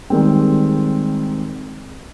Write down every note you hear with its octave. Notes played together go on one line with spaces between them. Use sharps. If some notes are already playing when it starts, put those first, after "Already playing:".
D#3 G3 G#3 C4